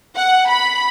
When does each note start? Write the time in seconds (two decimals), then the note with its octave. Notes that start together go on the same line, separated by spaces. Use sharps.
0.16 F#5
0.50 B5